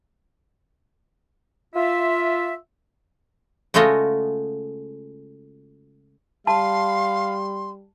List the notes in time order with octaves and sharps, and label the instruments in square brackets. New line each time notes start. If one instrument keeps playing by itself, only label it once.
[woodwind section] F4 E5
[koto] C#3 G#3 A3 F4 F#4 D#5
[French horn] G3 [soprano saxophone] F5 [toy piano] A5 [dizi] C6